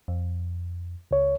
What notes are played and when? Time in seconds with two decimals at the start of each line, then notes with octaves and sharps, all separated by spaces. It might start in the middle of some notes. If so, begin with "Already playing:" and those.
0.08 F2
1.11 C#2 C#5